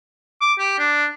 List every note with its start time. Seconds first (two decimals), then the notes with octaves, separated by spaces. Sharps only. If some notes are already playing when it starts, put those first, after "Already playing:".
0.41 D6
0.59 G4
0.79 D4